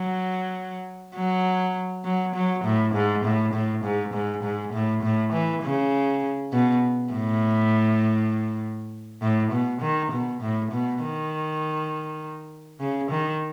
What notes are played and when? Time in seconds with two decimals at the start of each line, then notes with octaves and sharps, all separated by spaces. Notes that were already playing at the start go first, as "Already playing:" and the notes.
Already playing: F#3
1.15 F#3
2.04 F#3
2.35 F#3
2.64 A2
2.95 G#2
3.25 A2
3.53 A2
3.84 G#2
4.14 G#2
4.43 G#2
4.73 A2
5.03 A2
5.33 E3
5.63 C#3
6.52 B2
7.13 A2
9.22 A2
9.52 B2
9.81 D#3
10.12 B2
10.41 A2
10.72 B2
11.02 D#3
12.80 C#3
13.11 D#3